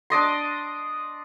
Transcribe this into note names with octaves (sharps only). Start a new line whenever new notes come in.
D4 D5 D#5 C6